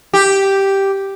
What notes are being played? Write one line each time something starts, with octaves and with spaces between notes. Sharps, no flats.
G4